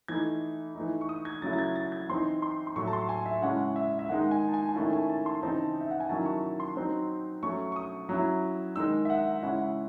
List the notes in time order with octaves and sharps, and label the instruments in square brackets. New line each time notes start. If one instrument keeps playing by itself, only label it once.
[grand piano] E3 A3 D#4 G#6
E3 A3 D#4
C#6
D#6
G#6
C#3 F#3 A3 C#4 E4 A6
A6
G#6
A6
G#6
E3 C4 D#4 C6
C6
C6
A2 F#3 A3 C#6
A5
C6
G#5
E5
C#3 G#3 C#4 E4 F#5
E5
E5
D#3 G#3 D#4 F#5
G#5
A5
G#5
G#5
D#3 A3 C#4 E4 A5
G#5
A5
C6
C#3 E3 C4 D#4 A5
E5
F#5
G#5
D#3 F#3 C#4 E4 A5
C#6
C#6
C6
F#3 C4 D#4
F#3 A3 C#4 C#6
C#6
D#6
F#3 C#4 E4
D#3 G#3 D#4 E6
E5
F#5
C#3 G#3 C#4 E4 F#5